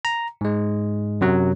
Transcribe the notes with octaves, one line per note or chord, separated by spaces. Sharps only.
A#5
G#2 G#3
F#2 C3 F#3